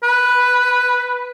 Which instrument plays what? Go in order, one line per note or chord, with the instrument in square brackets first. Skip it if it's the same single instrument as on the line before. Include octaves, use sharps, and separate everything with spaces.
[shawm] B4